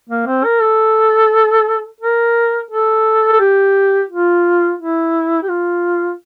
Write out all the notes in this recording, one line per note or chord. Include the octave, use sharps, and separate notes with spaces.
A#3
C4
A#4
A4
A#4
A4
A4
G4
F4
E4
G4
F4